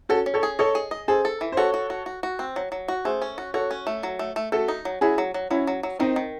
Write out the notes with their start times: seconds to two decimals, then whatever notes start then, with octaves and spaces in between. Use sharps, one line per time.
0.09 C#4 F#4 A4
0.26 C#4
0.34 A4 C#5
0.43 G#4
0.59 A4 C#5 D#5
0.75 G#4
0.91 D#5
1.08 G#4 A4 C5
1.25 A4
1.41 E3
1.52 C5
1.57 F#4 A4 C#5
1.74 F#4
1.90 F#4
2.06 F#4
2.23 F#4
2.39 C4
2.56 F#3
2.72 F#3
2.88 F#4
3.05 A3 G#4 C5
3.22 C#4
3.38 F#4
3.54 F#4 A4 C#5
3.71 C#4
3.87 A3
4.03 F#3
4.19 A3
4.36 A3
4.52 A3 F#4 A4
4.68 D#4
4.85 F#3
5.01 F#3 E4 G#4
5.18 F#3
5.34 F#3
5.50 F#3 C#4 E4
5.67 F#3
5.83 F#3
5.99 D#3 C4 D#4
6.16 D#3